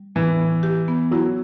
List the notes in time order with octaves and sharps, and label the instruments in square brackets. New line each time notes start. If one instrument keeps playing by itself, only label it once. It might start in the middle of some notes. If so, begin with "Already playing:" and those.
Already playing: [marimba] G3
[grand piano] E3 [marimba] B3
[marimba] A2
G4
B3
[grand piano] F#3 [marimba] E4